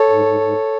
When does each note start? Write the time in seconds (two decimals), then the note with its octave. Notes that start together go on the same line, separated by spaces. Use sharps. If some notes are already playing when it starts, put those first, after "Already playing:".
Already playing: A4 C#5
0.10 G#2
0.26 G#2
0.41 G#2